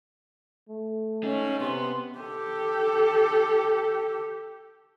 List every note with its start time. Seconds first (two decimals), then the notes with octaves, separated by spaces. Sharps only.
0.69 A3
1.23 C#4 D#4 G#4
1.60 C3 B3 C6
2.19 G4 A4